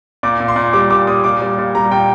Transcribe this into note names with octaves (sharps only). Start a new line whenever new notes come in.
A#2 D6
A#2
C6
A#2
G3 D6
A#2 D6
A#2 D#6
A#2 D6
G3
A#2
G3 A#5
A#2 G5